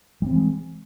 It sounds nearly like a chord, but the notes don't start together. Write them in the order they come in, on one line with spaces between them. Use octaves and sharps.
G3 C4 E3 G#3